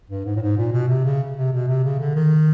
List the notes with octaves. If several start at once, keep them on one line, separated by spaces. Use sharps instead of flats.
G2
G#2
A2
G#2
A#2
B2
C3
C#3
C3
B2
C3
C#3
D3
D#3